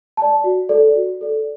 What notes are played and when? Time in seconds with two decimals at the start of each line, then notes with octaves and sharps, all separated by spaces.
0.17 D5 A5
0.44 F#4
0.69 A4 D5
0.96 F#4
1.21 A4 D5